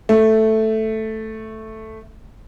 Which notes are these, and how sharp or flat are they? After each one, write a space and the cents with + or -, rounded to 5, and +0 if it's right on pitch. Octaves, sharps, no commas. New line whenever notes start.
A3 +0